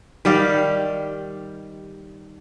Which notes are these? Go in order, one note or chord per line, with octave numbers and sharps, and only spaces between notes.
D#3 G3 G4 F5